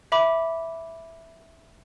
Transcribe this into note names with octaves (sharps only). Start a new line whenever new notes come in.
E5 B5 D6